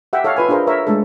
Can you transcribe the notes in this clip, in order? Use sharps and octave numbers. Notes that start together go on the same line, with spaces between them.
G4 E5 F#5 G5
A4 C#5 D#5 F5
F4 B4 G#5
D4 F4 G#4 A#4 C5
A#4 C#5 E5
G#3 A3 D4 A4